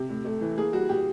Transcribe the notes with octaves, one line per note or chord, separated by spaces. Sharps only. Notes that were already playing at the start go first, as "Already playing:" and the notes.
Already playing: C3
A2
A3
E3
A#3 G#4
G3 F#4
A#2 G4